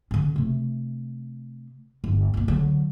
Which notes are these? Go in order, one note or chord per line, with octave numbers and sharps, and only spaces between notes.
D3 C#4
C3 A3
G1
G1 A#2
D3 F#3